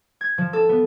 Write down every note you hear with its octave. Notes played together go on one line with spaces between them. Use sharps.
G#6
F3
A4
B3